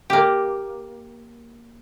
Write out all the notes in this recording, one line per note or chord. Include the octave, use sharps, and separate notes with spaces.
A#3 G4